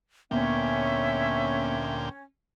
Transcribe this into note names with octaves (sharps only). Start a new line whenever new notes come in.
D2 A#2 A#3 B3 C#4 E5 G5